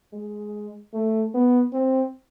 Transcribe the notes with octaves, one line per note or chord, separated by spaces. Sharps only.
G#3
A3
B3
C4